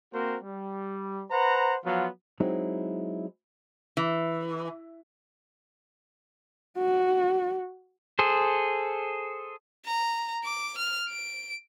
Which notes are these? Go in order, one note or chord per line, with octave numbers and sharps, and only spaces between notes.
A#3 C4 F#4 A#4 C5
G3
B4 C5 F#5 A#5
F3 F#3 B3 F4
F#3 G#3 C4 D#4 E4
E3
F#4
G#4 A4 C5
A#5
D6
F6
D7